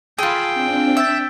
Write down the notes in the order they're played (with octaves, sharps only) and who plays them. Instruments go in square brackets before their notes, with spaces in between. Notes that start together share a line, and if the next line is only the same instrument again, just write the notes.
[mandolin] F4 G#4 [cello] G5 [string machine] A5 B5 [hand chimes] E6
[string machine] C4 D4
[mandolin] E5 [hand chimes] E6 G6 A6